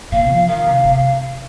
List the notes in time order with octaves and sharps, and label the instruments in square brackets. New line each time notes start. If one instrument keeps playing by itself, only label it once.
[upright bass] A#2 [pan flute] F5
[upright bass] F3
[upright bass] D#3 [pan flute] F5
[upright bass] C3
C3